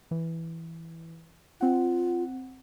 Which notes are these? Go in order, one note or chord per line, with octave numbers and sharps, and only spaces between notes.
E3
C4 F4 F#5